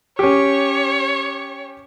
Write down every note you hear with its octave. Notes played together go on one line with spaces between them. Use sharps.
C#4 G4 C#5